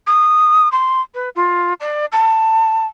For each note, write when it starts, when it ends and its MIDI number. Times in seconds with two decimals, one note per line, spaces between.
0.07 0.71 87
0.72 1.01 84
1.14 1.29 71
1.36 1.73 65
1.80 2.05 74
2.12 2.86 81